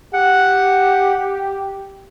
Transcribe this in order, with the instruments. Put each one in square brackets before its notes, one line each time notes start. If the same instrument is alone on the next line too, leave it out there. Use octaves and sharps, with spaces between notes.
[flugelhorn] G4 [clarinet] F#5